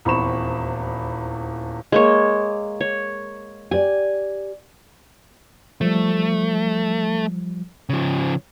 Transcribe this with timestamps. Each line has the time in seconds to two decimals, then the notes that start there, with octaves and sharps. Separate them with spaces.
0.05 D#1 E2 C4 B5 C#6 E7
1.92 G#3 A#3 C#5
2.81 C#5
3.71 G4 D5 G#5
5.81 F3 G3 A3
7.89 C#3 F3